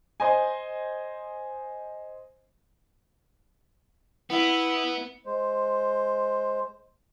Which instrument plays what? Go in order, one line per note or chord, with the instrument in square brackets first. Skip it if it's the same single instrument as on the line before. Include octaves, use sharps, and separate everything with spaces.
[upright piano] C5 D#5 G#5
[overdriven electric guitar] B3 [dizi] E4
[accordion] G#3 C5